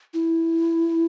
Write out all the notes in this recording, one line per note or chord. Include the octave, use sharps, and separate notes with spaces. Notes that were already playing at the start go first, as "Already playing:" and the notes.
E4